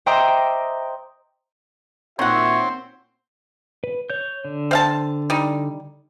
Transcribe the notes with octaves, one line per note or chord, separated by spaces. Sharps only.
C5 D#5 E5 G5 A#5 D6
A#2 D#3 C4 F#4 C#5 E5 F#5
B4
C#5 G6
D3
C4 F5 A5
G3 D#4